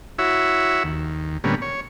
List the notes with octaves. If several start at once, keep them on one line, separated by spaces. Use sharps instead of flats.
E4 F#4 C#5 E5
D#2
A2 D3 G3 A#3 B3 C#4
C#5